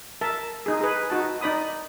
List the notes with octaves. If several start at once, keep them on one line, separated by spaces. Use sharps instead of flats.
A#4 E5 A5
D#4 G#4
G#4 B4
D#4 F#4 A5
D#4 D5 B5 D#6